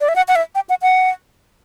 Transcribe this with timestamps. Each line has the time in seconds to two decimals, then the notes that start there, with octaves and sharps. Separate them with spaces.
0.01 D5
0.08 E5
0.16 F#5
0.28 F#5
0.35 E5
0.55 G5
0.69 F#5
0.82 F#5